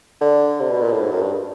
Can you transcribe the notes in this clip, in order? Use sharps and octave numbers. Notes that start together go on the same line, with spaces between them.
D3
C3
B2
A#2
A2
G#2
F#2
G2